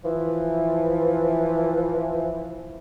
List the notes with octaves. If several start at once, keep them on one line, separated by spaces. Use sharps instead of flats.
E3 F3